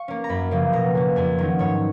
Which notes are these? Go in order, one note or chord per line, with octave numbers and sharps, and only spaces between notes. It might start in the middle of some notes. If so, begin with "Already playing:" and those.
Already playing: F5 C#6
A#3 C#4
A#5
F#2 B5
C#3 F3 A#3 C#4
B2 A#5
A#3 C#4
F2 G#5
D#3 F#3 C#4
G#2 C#5